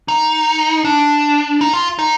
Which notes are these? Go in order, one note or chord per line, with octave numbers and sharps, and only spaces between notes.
D#4
D4
D#4
F4
D#4